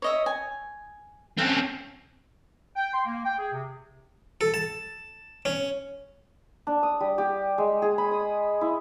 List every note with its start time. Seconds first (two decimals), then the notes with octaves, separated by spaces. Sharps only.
0.02 C#5 D#5 E5
0.26 G#5
1.38 C4 C#4 A4 F5 F#5
2.76 G5
2.94 C6
3.05 A#3
3.25 G5
3.38 G#4
3.52 C3
4.41 A4
4.54 A5
5.45 C#4
6.67 D4
6.83 D#6
7.00 G3
7.18 G4
7.58 G#3
7.82 G#4
7.98 B5
8.11 D#6
8.61 E4